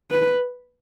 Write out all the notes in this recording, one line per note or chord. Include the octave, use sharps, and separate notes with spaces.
B4